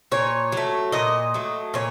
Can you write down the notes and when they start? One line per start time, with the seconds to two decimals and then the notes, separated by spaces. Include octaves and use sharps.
0.12 A#2 C#5
0.52 F#3 A3
0.92 A#2 D#5
1.34 F#3 A3
1.74 A#2 C#5